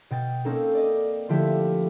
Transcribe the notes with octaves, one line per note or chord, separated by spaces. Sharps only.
B2 G5 A6
A#3 C4 C#4 D#4 A4 A#4
D5 D#5
D3 F3 A3 E4 G4